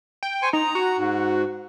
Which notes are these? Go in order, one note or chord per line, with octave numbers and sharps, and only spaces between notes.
G5
C5 G#5 C#6
D#4 A#5
F#4
G#2